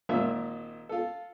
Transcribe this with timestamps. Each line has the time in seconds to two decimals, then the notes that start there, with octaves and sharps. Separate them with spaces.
0.09 G#1 A#2 A#3 F4 A#4 E5
0.89 F4 A4